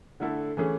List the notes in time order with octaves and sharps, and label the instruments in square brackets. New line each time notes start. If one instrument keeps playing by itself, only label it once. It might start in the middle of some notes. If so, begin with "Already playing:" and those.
[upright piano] D3 A3 E4 A4
E3 A3 C#4 G#4